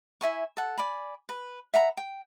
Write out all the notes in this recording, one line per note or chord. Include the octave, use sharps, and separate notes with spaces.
E4 E5 G#5 C#6
A4 F#5
D5 G#5 B5
B4
E5 F#5 A#5 B5
G5